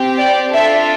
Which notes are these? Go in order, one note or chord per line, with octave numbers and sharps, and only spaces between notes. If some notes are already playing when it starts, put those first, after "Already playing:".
Already playing: C4 G4
D5
D4 F4 A4 E5